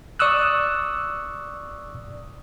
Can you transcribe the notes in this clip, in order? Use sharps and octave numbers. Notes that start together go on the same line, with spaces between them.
D5 C#6 D#6 E6 F#6